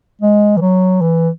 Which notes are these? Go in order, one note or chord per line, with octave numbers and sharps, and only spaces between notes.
G#3
E3
F#3
E3